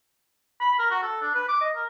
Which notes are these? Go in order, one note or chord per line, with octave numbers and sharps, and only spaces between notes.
B5
A#4
F#4
A4
D4
B4
D6
D#5
A#4